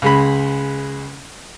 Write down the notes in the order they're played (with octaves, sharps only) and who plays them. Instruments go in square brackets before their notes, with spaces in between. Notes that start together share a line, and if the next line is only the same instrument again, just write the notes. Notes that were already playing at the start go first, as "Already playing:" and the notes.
[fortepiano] C#2 G#3 B5